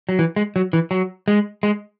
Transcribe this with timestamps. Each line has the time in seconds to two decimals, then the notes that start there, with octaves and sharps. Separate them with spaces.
0.09 F#3
0.19 E3
0.36 G#3
0.56 F#3
0.73 E3
0.91 F#3
1.28 G#3
1.63 G#3